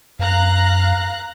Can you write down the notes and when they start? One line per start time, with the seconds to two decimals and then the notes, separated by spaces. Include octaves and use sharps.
0.19 F#2 F5 A#5 F#6